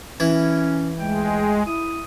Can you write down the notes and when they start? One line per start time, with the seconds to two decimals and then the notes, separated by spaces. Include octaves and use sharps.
0.20 E3 C#4 E4
0.99 C#2 G#3 A3 G5
1.67 E4 D#6